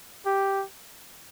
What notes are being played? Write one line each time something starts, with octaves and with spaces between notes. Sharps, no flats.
G4